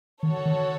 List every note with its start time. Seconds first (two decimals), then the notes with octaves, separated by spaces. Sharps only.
0.22 D#3 F#4 A4 C#5
0.46 D#3